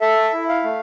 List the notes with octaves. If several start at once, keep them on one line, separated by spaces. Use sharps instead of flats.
A4 E5
E4
F5
A3